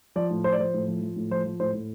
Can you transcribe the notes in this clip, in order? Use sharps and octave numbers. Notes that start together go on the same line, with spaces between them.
F3 D5
A2
F3 C5
D5
F3 C5
A2
F3
F3
A2
F3 C5
F3
A2 C5
A2